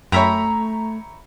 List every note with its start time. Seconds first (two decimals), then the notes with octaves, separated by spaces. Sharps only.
0.12 F#2 A3 C#5 E5 G5 A#5 B5